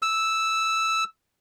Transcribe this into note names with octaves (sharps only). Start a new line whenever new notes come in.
E6